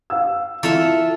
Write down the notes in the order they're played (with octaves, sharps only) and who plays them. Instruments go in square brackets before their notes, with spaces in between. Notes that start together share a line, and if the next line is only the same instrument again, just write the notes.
[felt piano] F5 E6
[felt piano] E3 [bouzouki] F4 A4 E5